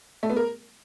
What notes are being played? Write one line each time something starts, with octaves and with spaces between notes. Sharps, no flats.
A3
B3
A#4